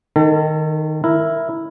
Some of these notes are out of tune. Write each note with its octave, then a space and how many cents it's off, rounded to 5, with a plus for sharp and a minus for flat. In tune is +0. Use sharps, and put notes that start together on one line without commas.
D#3 +0 A4 +35
E4 +0 A#4 +0